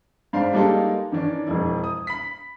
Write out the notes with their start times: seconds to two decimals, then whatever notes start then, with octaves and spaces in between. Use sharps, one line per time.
0.33 G#2 D4 C5 F5
0.53 G3 G#3 A#3 D#4 F4 A4
1.12 D#3 E3 C#4 D4
1.47 E1 F2 E4
1.84 D#6
2.07 B5 B6